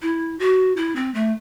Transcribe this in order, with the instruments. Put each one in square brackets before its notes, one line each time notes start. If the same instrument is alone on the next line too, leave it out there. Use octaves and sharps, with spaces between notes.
[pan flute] E4
F#4
E4
C4
A3